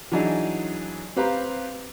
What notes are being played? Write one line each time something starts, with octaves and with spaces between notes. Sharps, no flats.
E3 F#3 D4 D#4 G#4
C4 G4 B4 F5 A#5